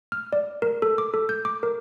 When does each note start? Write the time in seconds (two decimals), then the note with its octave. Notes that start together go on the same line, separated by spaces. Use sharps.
0.12 F6
0.33 D5
0.62 A#4
0.82 A4
0.98 D6
1.14 A4
1.29 G6
1.45 D6
1.63 A#4